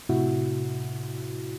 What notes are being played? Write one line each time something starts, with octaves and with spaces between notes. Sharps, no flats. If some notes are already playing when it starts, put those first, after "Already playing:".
A2 C3 E4 F#4